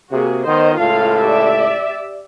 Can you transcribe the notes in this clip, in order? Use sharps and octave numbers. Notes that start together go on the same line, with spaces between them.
C3 A#3 F#4 G#4
D#3 B3 C5 D#5
C#2 A2 F4 A4 F5
G4 D5 E5